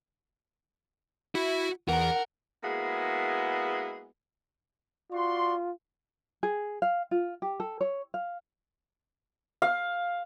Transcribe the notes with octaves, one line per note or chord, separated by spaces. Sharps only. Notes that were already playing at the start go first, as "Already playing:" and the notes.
E4 F#4
E2 A#4 F#5 A#5
G#3 A#3 B3 E4 F#4 G#4
F4 F#4 D5 C6
G#4
F5
F4
G4
A4
C#5
F5
F5